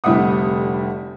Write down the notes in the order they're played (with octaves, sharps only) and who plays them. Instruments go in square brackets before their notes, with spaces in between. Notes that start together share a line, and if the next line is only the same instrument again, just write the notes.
[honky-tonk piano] F1 D3 G3 E4 F#5 D#6